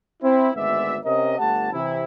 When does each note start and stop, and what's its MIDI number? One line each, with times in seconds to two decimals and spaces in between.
0.23 0.50 60
0.23 0.50 64
0.55 0.98 32
0.55 0.98 38
0.55 0.98 56
0.55 0.98 59
0.55 0.98 74
0.55 0.98 76
1.04 1.38 48
1.04 1.38 61
1.04 1.38 70
1.04 1.38 75
1.39 1.72 31
1.39 1.72 57
1.39 1.72 67
1.39 1.72 78
1.39 1.72 81
1.73 2.04 48
1.73 2.04 52
1.73 2.04 64